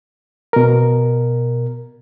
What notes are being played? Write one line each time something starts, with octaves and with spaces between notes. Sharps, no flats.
B2 A#4